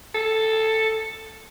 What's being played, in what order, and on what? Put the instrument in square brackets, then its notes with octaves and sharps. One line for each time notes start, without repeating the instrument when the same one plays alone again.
[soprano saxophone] A4